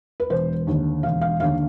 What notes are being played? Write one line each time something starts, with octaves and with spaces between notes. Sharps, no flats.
B4
E1 C5
D#2 D3
E1 F5
F5
D#2 D3 F5